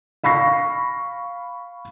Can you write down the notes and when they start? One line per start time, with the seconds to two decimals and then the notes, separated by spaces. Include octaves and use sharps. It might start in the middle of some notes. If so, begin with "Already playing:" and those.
0.24 F5 B5 C#6 A#6 C7